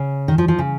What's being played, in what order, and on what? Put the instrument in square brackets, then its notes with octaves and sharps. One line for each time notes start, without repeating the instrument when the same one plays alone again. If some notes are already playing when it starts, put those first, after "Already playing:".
Already playing: [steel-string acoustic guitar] C#3
D#3
F3
F3
C#3